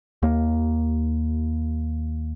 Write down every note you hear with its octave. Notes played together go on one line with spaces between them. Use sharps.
D#2 A#3